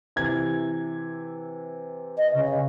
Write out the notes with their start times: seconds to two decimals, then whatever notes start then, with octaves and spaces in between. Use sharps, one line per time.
0.16 C3 E3 G#6
2.17 D#5
2.34 C#3